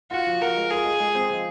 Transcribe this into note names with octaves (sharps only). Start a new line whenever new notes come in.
F4 F#4
F3
F3 A#4
G#3
F4 G#4
G#3
G#3
C4
F3